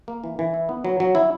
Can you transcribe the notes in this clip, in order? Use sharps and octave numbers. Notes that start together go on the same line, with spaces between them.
A#3
E3
E3
E4
B3
F#3
F#3
E4